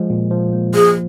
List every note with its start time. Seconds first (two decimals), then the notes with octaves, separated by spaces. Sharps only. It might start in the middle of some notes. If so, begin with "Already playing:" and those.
Already playing: F3 G#3
0.10 A#2
0.31 F3
0.53 A#3
0.75 F3 G#4